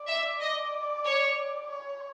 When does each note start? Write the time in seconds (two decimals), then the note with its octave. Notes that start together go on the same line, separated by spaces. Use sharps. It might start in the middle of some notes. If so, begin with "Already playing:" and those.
Already playing: D5
0.08 E5
0.41 D#5
1.05 C#5
1.70 C#5